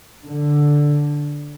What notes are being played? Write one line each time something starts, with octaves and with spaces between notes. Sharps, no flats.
D3